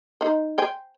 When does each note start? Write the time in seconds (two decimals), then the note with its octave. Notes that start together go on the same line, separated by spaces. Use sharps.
0.21 D#4 C5
0.58 C5 G5 G#5